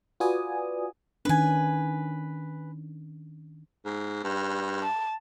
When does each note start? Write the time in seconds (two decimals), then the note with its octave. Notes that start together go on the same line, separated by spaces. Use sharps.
0.20 F4 F#4 B4 D5 G#5 D#6
1.25 D#3 C#4 D4 B4 G#5
3.85 G#2
4.24 G2
4.82 A5